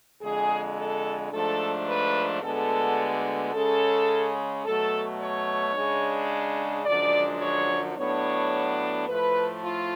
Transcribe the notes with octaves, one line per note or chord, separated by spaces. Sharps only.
F2 D3 G#3 G#4
A4
G#2 F3 A3 D4 A4
B4
D2 D3 G#3 B3 A4
C#3 G#3 C#4 A4
B2 F#3 A3 A4
C#5
C#3 G#3 D4
F#2 D3 F3 G#3 D4 D5
C#5
A2 F#3 B3 D4 C#5
A2 F3 A3 B4
F4